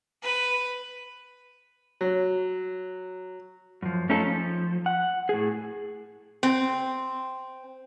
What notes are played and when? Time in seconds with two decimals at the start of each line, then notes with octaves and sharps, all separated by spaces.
0.23 B4
2.01 F#3
3.82 F#2 F3
4.09 A3 C#4 D#4 F4 A4
4.27 F3
4.86 F#5
5.29 A2 G#4
6.43 C4